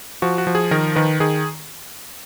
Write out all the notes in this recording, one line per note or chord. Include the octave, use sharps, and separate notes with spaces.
F3 F#4
F#4
F3
G#4
D#3 A#4
D#3 B4
D#3 G#4